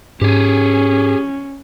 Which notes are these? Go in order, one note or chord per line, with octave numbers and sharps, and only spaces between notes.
G#2 C#4 G4 G#4